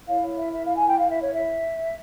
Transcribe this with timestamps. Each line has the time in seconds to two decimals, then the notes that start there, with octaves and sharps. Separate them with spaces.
0.06 E4 A#4 C#5 F5
0.21 C#5
0.36 E5
0.52 E5
0.64 F5
0.75 G#5
0.87 G5
0.98 F5
1.10 E5
1.21 C#5
1.33 E5